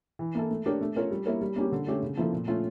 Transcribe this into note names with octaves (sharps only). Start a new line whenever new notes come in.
E3
A#3 E4 A4
A3
D4 G4 A#4 C#5
A3
C#4 F4 A#4 C#5
G3
A#3 E4 A#4 C#5
G3
A#3 C#4 G4
D3
A3 C#4 G4
C#3
F3 A#3 E4 A4
A#2
A3 C#4 F4 C#5